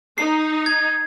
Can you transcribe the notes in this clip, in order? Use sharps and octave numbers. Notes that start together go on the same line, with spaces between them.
D#4 C7
G#6